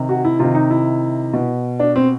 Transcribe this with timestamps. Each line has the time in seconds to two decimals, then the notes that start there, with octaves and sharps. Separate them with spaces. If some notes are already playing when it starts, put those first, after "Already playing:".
Already playing: C3 D#3
0.09 F#4
0.24 E4
0.39 C3 D#3 F4
0.55 D#4
0.70 E4
1.33 B2
1.80 D4
1.96 C4